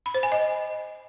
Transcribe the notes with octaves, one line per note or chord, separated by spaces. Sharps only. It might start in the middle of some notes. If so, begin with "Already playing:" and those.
B5
C5
G#5
D#5